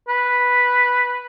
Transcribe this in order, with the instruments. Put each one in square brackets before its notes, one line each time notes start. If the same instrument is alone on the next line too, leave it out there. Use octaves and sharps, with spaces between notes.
[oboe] B4